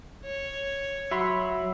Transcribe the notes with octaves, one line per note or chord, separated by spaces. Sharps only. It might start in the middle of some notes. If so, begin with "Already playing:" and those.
C#5
F#3 E5 B5 C6